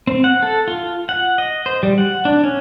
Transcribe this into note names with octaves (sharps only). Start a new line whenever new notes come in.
C4
F#5
A4
F4
F#5
D#5
C5
G3
F#5
D4
C#4